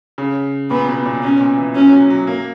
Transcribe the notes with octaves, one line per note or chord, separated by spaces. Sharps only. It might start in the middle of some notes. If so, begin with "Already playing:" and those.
C#3
A#2 B3
B2
A#2
B2 C#4
A#2
E3
F#3 C#4
F#3
F#3
A#3